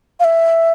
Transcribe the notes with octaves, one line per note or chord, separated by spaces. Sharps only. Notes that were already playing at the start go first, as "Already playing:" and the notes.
F5
E5